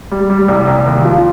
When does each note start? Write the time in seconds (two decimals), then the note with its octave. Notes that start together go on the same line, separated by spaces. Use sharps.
0.12 G3
0.30 G3
0.48 C2
0.67 C2
0.86 D#2
1.05 F3